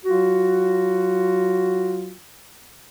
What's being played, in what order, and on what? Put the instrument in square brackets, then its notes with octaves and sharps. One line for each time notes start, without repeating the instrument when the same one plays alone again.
[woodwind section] F#3 F4 F#4